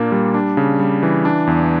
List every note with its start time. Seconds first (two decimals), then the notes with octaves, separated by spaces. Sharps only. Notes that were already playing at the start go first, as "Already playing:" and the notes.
Already playing: A#2 A#3 D4
0.12 G3
0.34 D4
0.57 C#3
0.79 G3
1.03 E3
1.25 D4
1.47 E2